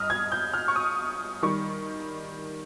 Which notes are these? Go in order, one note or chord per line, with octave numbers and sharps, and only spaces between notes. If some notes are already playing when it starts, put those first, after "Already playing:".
Already playing: G1 G2 D#5 D#6 F6
G#6
G6
F6
C#6
D#6
D#3 G3 C#6